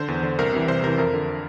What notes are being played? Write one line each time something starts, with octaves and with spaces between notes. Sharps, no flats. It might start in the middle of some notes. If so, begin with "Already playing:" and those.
Already playing: D3 C5
E2
D3
C2 A#4
C3 E3
C2 C5
C3 E3 A#4
F2 A#4
D3